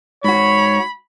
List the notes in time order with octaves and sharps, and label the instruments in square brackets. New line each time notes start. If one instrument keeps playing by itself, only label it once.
[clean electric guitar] G#2 F#4 [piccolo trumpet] C#5 [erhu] B5